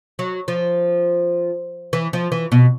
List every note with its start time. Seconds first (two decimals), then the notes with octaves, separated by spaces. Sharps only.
0.19 F#3
0.48 F3
1.93 E3
2.13 F3
2.32 E3
2.52 B2